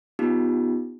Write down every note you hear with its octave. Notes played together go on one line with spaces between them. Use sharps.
B3 C#4 D#4 F4 G4